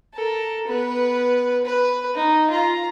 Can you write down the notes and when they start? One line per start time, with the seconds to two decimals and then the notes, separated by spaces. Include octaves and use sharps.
0.14 A4 A#4
0.68 B3 B4
1.65 B4
2.15 D#4
2.51 F4 A#5